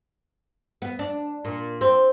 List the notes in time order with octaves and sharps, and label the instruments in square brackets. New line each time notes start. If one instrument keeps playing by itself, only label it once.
[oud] B3
D4
A#2
C4